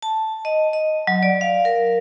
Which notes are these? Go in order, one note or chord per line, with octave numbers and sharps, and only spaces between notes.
A5
D#5
D#5
F#3
D5
F5
A#4